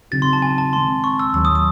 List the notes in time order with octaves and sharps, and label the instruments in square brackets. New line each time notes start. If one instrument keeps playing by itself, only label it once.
[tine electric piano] C#3 F#3 C4 D#4 F#4 [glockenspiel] A6
[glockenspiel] C6
A5
G#5
A5
[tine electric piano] D#3 G#3 C4 [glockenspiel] C6
[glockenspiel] C#6
E6
[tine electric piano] D#2 D#3 F#3 [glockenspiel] E6
[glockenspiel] D#6
D#6